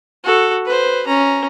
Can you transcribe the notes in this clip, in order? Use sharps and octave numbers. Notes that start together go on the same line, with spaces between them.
F#4 A4
B4 C5
C#4 A#5